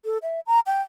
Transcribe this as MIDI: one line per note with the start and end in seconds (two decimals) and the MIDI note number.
0.05 0.18 69
0.23 0.40 76
0.47 0.59 82
0.66 0.82 79